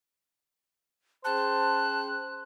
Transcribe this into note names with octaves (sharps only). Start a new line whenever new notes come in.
C#4 G#4 C5 G5 A5 F#6